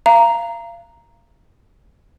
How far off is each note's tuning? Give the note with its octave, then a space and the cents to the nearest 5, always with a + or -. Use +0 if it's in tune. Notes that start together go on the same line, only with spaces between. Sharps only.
F5 -30 A#5 +0